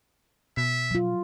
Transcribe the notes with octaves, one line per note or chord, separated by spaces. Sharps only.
B2 E5
F#3 F4